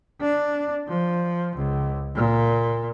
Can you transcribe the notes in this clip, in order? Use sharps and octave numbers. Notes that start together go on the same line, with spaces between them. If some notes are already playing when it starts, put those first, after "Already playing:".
D4
F3
C#2
A#2